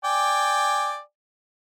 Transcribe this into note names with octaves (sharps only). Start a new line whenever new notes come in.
D5 G5 G#5